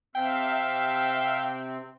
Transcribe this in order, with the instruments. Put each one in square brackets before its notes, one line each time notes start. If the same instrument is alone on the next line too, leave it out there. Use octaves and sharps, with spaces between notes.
[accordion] C3 C4 [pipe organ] E5 F5 [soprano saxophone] G5